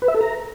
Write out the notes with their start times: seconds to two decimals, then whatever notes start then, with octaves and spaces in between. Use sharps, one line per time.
0.02 B4
0.08 E5
0.14 A4
0.21 A#5